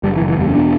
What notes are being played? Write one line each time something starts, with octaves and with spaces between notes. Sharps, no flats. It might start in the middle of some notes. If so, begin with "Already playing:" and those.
F#1 G3
E3
F#1
E3
E2 G3
C#4
B2 D4